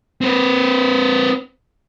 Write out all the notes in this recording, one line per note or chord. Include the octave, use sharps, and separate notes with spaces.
C4 B4